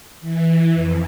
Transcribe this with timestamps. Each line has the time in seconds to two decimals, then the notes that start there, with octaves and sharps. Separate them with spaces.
0.21 E3
0.74 F2